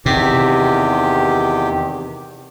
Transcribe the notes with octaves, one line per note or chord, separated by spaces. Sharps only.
E2 C3 D#3 G4